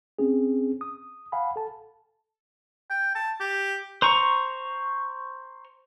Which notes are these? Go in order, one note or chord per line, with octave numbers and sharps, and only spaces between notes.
C4 C#4 G#4
D#6
F5 F#5 G#5 B5
A4 A5
G5
A5
G4
C5 A#5 C#6